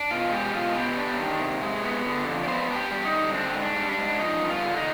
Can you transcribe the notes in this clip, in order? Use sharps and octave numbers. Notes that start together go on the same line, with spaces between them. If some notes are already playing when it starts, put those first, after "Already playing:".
Already playing: D4
B2 F4
G#3 G4
B2 F4
B3 G4
D4
D#3
C3
G#3
B3
D3
F2
D5
B3 C5
D4
G4
G3
D#4
D3
C4 D4
G#2
D4
G3
D4
G#2
F3 D#4
G2
F4
D3
D#4